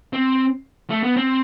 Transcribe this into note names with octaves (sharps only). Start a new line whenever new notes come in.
C4
A3
B3
C4